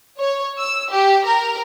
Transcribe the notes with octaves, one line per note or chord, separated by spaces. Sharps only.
C#5
E6
G4
A#4